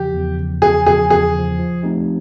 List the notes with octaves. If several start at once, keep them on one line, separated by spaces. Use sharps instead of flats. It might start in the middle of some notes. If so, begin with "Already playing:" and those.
Already playing: E2 C#3 F3 G4
E2
C#3 F3
E2 G#4
C#3 F3 G#4
E2 G#4
C#3 F3
F3
A3 C4 D#4 G4